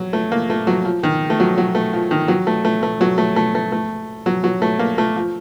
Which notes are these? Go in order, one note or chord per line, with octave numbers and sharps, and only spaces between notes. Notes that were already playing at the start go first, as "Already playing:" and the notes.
Already playing: F#3
A3
A#3
A3
F#3
F3
D#3
A3
F#3
F#3
A3
F3
D#3
F#3
A3
A3
A3
F#3
A3
A3
A3
A3
F#3
F#3
A3
A#3
A3
F3